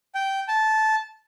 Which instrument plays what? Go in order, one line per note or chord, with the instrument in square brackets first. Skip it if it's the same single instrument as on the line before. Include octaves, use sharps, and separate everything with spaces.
[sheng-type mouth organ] G5
A5